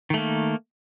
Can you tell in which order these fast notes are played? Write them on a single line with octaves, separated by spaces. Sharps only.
D#3 A3 A#3